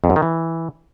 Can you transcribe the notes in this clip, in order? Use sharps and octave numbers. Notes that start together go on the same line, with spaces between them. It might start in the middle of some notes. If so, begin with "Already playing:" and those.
F2
F#2
D#3
E3